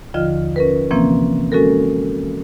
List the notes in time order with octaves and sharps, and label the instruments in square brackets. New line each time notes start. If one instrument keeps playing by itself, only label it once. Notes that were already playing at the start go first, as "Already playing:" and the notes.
[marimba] D#2 D3 F3 F4 D#5 F6
C#4 A#4 B4
C3 E3 F3 A#3 C4 C#4
G#3 C#4 F#4 A4 A#4